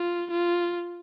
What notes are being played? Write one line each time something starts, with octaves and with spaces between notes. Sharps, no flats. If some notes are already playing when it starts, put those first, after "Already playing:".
Already playing: F4
F4